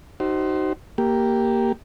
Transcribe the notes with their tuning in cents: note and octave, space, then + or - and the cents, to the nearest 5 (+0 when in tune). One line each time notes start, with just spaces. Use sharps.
D#4 +0 F#4 +40 C5 +0
A#3 +0 G4 +0